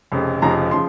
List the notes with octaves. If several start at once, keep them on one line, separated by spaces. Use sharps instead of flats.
F1 F2 C#3
F1 F2 C#3 F3 A#5
C#3 F3 C6